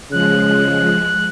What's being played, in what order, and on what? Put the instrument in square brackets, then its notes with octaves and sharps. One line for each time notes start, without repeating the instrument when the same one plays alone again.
[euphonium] C#3 [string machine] F3 G#3 [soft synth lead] F#6